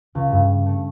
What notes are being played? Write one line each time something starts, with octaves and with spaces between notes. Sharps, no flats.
C#2
G2
A3